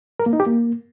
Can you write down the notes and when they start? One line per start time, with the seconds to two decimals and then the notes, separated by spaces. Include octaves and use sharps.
0.20 A#4
0.26 A#3
0.33 D#4
0.40 G4
0.46 A#3